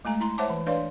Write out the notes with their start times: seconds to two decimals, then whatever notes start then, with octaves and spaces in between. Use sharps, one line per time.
0.05 G#3 A3 G#5 A#5
0.20 E4 A#5 C6
0.38 C5 C#5 E5 F#5 A5 D6
0.50 E3
0.66 D4 B4 C#5 D5 F5 C6